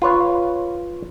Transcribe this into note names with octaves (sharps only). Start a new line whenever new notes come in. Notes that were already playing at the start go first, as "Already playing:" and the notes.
F4 B4 C#5